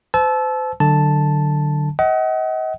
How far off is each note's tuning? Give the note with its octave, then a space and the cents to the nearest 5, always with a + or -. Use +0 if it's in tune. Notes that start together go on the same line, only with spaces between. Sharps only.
C5 -40 A5 -25 E6 +0
D3 +15 F#3 +20 A5 +0
D#5 +35 F#5 +35